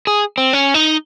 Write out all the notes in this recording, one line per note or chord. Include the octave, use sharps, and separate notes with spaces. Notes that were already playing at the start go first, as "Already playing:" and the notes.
G#4
C4
C#4
D#4